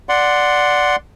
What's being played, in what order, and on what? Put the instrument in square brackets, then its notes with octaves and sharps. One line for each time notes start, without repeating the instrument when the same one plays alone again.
[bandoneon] D5 F#5 C6